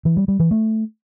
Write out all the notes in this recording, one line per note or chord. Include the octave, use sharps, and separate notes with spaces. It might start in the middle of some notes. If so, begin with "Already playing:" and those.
E3
G3
G3
E3
A3